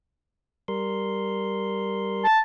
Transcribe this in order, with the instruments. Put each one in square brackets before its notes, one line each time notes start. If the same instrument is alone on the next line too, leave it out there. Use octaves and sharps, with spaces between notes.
[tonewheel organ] G3 A#4 C6
[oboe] A5